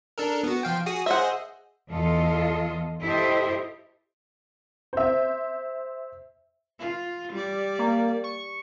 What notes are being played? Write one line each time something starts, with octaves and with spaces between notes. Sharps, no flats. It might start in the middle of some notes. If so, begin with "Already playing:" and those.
D4 A4 A#4
B3 F#4
F3 F5 G5
F#4 G#4 D#6
G#4 C5 D#5 E5 F#5
E2 F4 A4 D#5
E4 G4 A4 C5 D#5 E5
C5 E5
F4
G3 D5
A#3
C#6